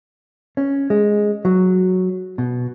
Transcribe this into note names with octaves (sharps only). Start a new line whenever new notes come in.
C#4
G#3
F#3
B2